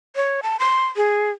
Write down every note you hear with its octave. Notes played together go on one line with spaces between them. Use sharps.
C#5
A5
C6
G#4